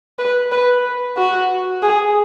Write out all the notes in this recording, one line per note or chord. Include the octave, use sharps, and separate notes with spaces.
B4
B4
F#4
G#4